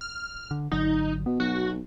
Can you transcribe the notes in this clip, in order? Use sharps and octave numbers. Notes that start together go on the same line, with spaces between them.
F6
D3
G#1 D3 F#3 D#4
B2 B3
B1 F#4